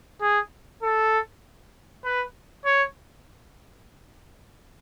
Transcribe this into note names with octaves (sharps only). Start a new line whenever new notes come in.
G#4
A4
B4
C#5